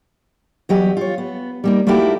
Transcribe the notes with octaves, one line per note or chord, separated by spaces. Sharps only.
E2 F#3 G4 D#5
F4 C#5
B3
G3 A#3 D#4
A3 A#3 D#4 E4 F#4 G4